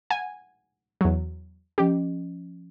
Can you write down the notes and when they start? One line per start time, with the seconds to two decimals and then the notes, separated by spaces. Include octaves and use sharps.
0.10 F#5 G#5
1.01 E2 F#3
1.78 F3 C#4 G4